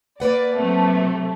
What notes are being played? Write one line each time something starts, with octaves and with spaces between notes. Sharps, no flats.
A#3 B4 D5 F#5
C3 F#3 A3